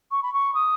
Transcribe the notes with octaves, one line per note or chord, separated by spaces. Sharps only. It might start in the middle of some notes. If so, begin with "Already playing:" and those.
C#6
B5
C#6
D#6